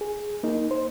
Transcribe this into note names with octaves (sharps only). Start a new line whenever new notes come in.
G#4
A#3 D#4
C5